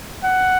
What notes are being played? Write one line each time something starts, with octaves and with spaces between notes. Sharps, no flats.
F#5